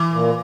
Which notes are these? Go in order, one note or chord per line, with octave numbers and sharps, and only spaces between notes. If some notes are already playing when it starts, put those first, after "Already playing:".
Already playing: E3
A#2